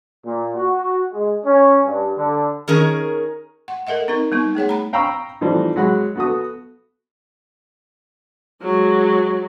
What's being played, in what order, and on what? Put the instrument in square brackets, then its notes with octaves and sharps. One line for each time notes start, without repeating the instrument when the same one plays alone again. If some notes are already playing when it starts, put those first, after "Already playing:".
[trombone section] A#2
F#4
G#3
C#4
G2
D3
[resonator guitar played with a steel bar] D#3 C#4 G#4 A#4
[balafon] F#5
A4 A#4 D#5 E5 F#5
C4 D#4 A#4
G3 B3 D#4
A3 G#4 C#5 F#5
A#5 B5
[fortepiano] F5 G5 A#5 B5 C#6 E6
E3 F3 G3 A3 C4 D#4
F#3 G#3 F#5 B5
B3 F#4 A4 D#6
[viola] F#3 G#3